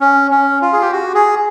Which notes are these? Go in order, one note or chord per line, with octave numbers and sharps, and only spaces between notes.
C#4
C#4
F4
G#4
G4
F#4
G#4